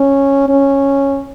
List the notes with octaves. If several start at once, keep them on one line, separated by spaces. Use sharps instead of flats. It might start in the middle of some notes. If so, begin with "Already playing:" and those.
Already playing: C#4
C#4